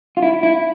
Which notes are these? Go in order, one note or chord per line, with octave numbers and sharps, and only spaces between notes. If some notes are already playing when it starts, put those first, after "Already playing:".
F4
E4
E4